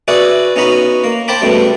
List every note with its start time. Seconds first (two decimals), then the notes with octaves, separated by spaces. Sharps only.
0.08 F#4 G#4 B4 D5 E5 F#5
0.56 B3 C#4 D#4 F#4 B5
1.04 A#3
1.28 C5 G5 A5 B5 D6
1.41 C#2 B2 G3 A3